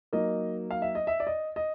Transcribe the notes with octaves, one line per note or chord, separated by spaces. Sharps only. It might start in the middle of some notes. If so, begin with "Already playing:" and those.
F#3 A#3 D#4 D#5
F5
E5
D#5
E5
D5
D#5
D#5